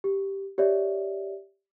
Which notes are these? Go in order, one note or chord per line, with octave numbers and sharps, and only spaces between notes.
G4
G4 C#5 D5 E5